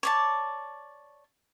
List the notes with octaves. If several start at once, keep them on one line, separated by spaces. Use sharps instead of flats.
C#5 D5 A5